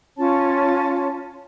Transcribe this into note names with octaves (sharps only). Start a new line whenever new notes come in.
C#4 F4 C#5 A5